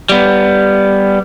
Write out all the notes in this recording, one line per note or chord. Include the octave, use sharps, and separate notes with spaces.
G3 B3